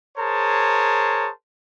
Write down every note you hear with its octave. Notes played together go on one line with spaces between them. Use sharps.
G#4 A#4 C5 C#5 A5